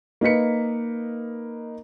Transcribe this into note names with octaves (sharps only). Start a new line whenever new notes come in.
A#3 D#4 B4 B6 C#7